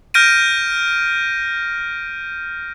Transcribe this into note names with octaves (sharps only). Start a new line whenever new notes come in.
F6 G6 A#6 D7 D#7